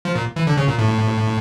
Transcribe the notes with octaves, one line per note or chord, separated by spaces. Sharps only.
F3
A#2
E3
D3
C#3
A#2
A2